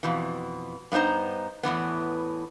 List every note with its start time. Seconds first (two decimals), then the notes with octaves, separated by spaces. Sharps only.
0.03 F2 B2 E3
0.92 G2 B3 D#4 C5 A#5
1.63 E2 A2 E3 B3